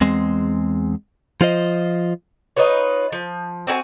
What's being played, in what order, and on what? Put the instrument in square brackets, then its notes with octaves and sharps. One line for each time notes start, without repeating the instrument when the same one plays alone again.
[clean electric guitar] E2 G#3 C4
F3 F4 C5 D#5
[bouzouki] D#4 F4 B4 C#5
F3
C4 F#4 G#4 G#5